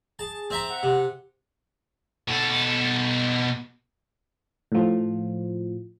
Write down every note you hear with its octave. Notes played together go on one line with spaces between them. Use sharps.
G#4 A5
C4 E5 A#5
F#5
C3
B2 A4
A2 F3